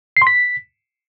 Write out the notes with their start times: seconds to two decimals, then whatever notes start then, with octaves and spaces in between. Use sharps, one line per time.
0.17 C7
0.22 C6
0.27 B6